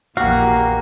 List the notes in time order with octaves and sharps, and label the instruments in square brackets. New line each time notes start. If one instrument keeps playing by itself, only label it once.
[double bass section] A#1 E2 E3 [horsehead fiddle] A#3 [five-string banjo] F#4 [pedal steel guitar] G4 F5